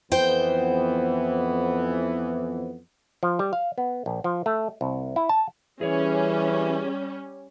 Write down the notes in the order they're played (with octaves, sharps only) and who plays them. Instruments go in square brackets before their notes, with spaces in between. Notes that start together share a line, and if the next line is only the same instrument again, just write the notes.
[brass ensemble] F2 E3 B3 [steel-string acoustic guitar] C5 G5
[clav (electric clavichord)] F3
G3
F5
B3
A#1
F3
A3
C2
E4
A5
[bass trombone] E3 [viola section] G3 C#4 [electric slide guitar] G#4 C#5